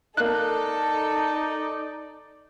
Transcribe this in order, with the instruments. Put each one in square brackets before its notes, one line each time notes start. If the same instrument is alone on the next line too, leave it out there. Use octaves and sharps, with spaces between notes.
[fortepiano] A#3 F#6 [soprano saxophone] D#4 [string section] A4 [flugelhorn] D5